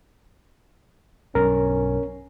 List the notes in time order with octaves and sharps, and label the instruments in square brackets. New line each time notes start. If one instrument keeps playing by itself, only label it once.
[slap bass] B1 G2 [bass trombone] C#4 [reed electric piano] A#4